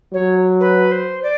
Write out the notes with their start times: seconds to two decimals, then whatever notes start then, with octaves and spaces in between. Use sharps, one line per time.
0.13 F#3 C#5
0.60 B4
0.91 C5
1.22 D5